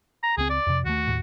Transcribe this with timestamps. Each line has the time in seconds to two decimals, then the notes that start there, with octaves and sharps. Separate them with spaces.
0.23 A#5
0.38 C#2 C4 G#4
0.50 D5
0.67 F2 C3
0.86 D#2 A3 F#4
1.07 D#2 A2